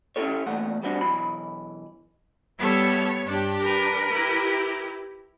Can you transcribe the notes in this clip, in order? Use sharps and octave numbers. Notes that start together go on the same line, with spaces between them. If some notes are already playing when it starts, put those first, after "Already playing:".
C#4 E4 F#4 G4 A4 C#5
E2 A#2 A3 F#5
G3 B3 C4 D4 F#4
B1 E3 B5
G3 B3 A4 C#5 E5
G2 D4 G4
A#4 B4
E4 G4